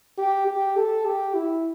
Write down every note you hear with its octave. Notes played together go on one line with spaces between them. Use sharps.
G4
G4
A4
G4
E4